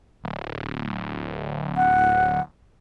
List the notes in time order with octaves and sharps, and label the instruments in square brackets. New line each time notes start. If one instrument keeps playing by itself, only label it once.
[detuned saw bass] D1
[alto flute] F#5